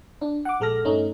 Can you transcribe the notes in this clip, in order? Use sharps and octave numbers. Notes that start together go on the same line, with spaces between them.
D4
F#5 D6
A#1 G#3 A4 F6 A#6
G2 A3 C#4 D#4